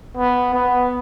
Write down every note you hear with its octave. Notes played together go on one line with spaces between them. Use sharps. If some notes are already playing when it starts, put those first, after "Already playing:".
B3
B3